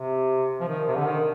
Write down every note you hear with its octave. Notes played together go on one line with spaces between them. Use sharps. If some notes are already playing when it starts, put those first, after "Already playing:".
Already playing: C3
F3
D#3
C3
D3
D#3